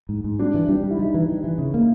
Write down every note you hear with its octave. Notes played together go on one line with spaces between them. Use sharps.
G#2
G#2
G3 D4
E3
G3 D4
G3
E4
G3 D#4
E3
G3
E3
C#3
A#3